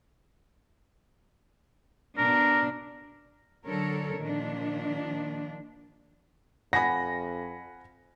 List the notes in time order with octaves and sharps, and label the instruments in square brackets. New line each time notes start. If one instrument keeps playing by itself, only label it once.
[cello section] B2 D4 [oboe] A#4
[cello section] D3 F#3 D4 A4 A#4 C#5
A#2 D#3 F3 D4
[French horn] F2 [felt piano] F#5 G#5 B5 [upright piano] A#6